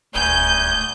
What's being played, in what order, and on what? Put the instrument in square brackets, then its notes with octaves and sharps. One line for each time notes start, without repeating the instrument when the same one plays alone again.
[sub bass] D#1 [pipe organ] D2 G#5 D#6 [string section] G6